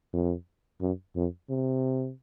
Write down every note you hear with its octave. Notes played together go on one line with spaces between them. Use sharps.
F2
F#2
F2
C3